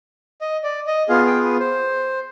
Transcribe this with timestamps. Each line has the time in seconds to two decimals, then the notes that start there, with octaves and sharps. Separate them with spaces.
0.41 D#5
0.64 D5
0.87 D#5
1.09 B3 F4 G#4 F5
1.26 G5
1.43 B4
1.60 C5